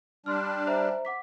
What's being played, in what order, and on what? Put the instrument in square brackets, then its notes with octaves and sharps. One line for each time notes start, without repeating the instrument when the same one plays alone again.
[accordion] G3 D4 [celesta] C6 F6
[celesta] C5 E5 A#5
F#5 D6 B6